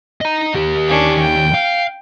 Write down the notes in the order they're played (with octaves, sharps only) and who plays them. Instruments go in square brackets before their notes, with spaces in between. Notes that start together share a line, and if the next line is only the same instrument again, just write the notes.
[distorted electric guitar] D#5 A#5
D#2 G4
[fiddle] C#4 D4
G5
[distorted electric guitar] F5